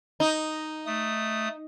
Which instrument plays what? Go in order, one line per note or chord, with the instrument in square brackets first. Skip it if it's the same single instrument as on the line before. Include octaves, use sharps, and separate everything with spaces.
[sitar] D#4
[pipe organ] A3 D#6